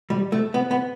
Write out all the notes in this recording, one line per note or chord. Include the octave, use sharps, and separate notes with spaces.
G3
A3
B3
B3